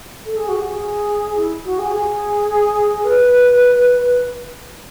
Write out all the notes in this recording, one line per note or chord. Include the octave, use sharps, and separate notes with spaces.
A4
G#4
F#4
G#4
E4
F#4
G#4
G#4
B4